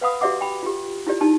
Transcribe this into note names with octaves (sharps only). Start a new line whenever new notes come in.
B4 F5 F#5 B5 D#6
F#4 G4 D5 E5 F#5 D6
G5 B5
F4 G4
E4 F4 G4 D5
D#4 E4 G4 A5